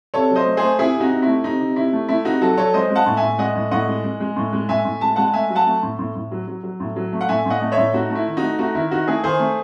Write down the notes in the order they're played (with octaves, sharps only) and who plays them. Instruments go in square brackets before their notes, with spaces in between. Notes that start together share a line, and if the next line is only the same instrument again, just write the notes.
[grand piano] C3 A4 C#5
F#3
C5 D#5
A3
G#4 C5
A3
C3 E4 G#4
C3
D#4 F#4
C3
E4
A3
C3 D#4
C3
C3 E4
A3
A3 E4
C3 D#4 F#4
F#3 F#4 A4
F#3 A4 C#5
G#3 C5 D#5
G#3
F#5 A5
A2
E5 G#5
A2
G#3 D#5 F#5
A2
A2 D#5 F#5
G#3
G#3
G#3
A2
G#3
A2 E5 G#5
A2
G#3 A5
G#3 F#5 A5
A3 E5 G#5
F#3
F#5 A5
A3
A2
A2
A2
F#3
F#3
F#3
A2
F#3
A3
F#5
A2 E5 G#5
A2 D#5 F#5
A3
C#5 E5
A2
A3 D#4 F#4
A3
E4
D#3
D#4 F#4
A3
A3 D#4 F#4
D#3 E4
D#3 D#4 F#4
A3 E4 G#4
D#3 G#4 C5
A3